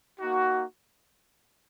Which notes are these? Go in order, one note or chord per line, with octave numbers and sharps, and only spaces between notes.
A#3 D#4 F#4